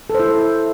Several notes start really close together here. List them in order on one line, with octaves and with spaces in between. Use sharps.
A4 C5 E4